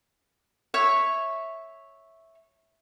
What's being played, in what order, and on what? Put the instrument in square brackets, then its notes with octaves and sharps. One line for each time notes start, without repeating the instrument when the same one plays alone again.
[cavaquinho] C#5 E5 C#6